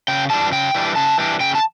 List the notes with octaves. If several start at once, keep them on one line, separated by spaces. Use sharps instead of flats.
C#3 G5
E3 G3 D4 A5
C#3 G5
E3 G3 D4
C#3 A5
E3 G3 D4
C#3 G5
A5